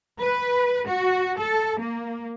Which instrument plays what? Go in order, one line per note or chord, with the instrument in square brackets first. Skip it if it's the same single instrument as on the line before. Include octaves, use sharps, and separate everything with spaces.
[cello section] B4
F#4
A4
A#3